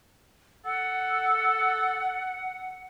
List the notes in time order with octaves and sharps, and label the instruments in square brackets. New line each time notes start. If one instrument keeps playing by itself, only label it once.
[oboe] A4 [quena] F#5